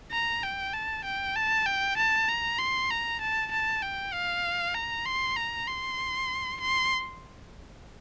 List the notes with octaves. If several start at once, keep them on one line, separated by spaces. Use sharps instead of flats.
A#5
G5
A5
G5
A5
G5
A5
A#5
C6
A#5
A5
A5
G5
F5
A#5
C6
A#5
C6
C6